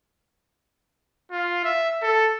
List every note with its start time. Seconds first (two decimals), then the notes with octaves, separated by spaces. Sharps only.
1.32 F4
1.64 E5
2.03 A4